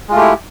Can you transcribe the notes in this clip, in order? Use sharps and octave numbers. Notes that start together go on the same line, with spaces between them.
G#3 A3 E4 F4 G4